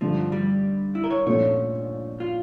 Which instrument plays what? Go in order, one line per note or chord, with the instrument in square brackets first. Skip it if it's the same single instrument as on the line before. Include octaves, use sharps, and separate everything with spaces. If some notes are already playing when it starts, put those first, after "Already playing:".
[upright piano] G2 D3 A3 [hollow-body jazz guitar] F3
[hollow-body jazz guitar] G3
E4
A#4
C#5
[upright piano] A#1 A#2 F3 A3 C#4 [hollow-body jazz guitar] C#5
[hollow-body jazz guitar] F4